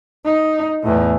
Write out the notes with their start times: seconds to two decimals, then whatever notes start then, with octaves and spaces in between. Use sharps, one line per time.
0.25 D#4
0.83 E2 A2